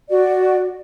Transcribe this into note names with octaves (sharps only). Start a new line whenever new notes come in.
F#4 D5